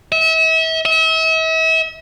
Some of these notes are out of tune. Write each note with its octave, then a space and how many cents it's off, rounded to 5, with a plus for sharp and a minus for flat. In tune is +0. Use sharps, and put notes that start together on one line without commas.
E5 -35
E5 -40